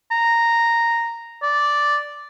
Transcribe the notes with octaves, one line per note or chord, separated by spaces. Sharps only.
A#5
D5